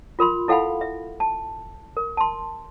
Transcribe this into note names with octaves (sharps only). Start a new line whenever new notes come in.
F4 A#4 B5 C6
E4 A4 F5 F#5 G#5 B5
E5
A5
A#4
A5 C6